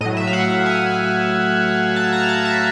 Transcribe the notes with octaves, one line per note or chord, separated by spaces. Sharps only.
A2 F#3 D#5
E5
F5
F#5
G#5
A5
A#5
A5
E5